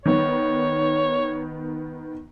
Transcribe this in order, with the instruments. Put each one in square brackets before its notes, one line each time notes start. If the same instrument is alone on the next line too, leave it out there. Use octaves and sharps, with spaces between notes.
[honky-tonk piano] D#3 B3 [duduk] C#5